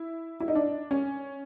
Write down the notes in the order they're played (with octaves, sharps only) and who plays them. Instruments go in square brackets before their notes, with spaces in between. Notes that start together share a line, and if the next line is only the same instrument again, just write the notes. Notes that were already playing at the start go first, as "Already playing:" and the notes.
Already playing: [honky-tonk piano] E4
E4
D#4
D4
C#4